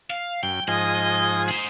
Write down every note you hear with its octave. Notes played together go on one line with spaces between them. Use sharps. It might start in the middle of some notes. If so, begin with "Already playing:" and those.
F5
F#2 G5
G#2 F3 D#5 G#5
G#4 C5